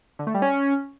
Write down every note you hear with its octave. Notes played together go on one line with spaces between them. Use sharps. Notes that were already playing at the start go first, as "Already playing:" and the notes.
D3
A3
G3
C#4